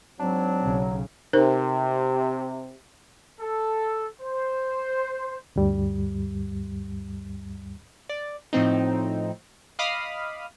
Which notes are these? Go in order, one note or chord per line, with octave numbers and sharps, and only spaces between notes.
G#2 F#3 C4 D4
B1 C#3
C3 D#4 A#4 C5
A4
C5
D2 G2 G3
D5
A2 F3 C4 D#4
D#5 F5 B5 D6 D#6 F6